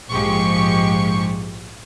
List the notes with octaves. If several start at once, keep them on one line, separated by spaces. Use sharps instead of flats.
A#1 G#2 F3 G#3 G4 C#6